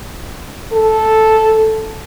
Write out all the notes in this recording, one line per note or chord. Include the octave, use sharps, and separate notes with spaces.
A4